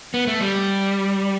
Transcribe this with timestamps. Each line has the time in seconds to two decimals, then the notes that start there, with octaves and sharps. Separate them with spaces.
0.14 B3
0.27 A3
0.41 G3